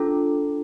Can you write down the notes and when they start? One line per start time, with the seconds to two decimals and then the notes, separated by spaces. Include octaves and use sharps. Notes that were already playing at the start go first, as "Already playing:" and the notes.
Already playing: D4 F4 A4